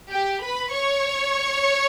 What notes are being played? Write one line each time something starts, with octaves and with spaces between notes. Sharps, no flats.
G4 G5
B4 B5
C#5 C#6